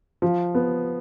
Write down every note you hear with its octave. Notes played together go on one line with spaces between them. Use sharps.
F3
B3